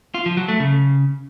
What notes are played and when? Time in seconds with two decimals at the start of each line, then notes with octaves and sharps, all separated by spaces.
0.14 F4
0.26 F3
0.37 F#3
0.48 A3
0.60 C#3